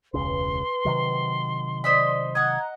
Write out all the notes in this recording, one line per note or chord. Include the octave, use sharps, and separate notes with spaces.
E1 C#2 C#3 B4 C6
C3 D#3 F#3
C5 D5 D#5 B5
D#5 F#5 A#5 G#6